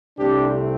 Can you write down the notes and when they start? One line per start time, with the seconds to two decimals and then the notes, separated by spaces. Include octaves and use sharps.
0.17 C2 C3 A3 C4 D4 G4